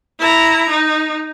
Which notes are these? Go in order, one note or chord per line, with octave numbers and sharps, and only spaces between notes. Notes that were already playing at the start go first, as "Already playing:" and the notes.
E4 A#5
D#4